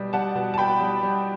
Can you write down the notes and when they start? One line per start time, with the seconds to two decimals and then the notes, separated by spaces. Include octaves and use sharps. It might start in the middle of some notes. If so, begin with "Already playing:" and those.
Already playing: B2 G3
0.13 G3 F#5 A5
0.35 B2
0.54 A5
0.58 B2 G5 B5
0.81 G3
1.03 G3